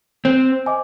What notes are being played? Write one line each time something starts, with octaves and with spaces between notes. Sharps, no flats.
C4 C5
D#5 G#5 D6